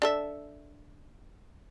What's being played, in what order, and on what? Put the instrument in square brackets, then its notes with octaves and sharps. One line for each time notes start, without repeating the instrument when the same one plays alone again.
[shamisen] D4 A4 E5